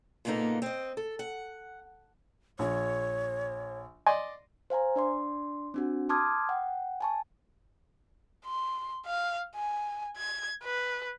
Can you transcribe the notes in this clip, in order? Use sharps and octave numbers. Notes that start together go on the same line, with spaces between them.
A#2 C#3 A#3 B3 D#4 A4
C4 D#5
A4
F#5
A#1 C#5
D5 D#5 G#5 C6
C5 F5 G#5 A#5
D4 D5 C6
C4 D4 F#4
A5 C6 D6 D#6 F6 G#6
F#5 G5
G#5 A5 C#6
C6
F5
G#5
G#6
B4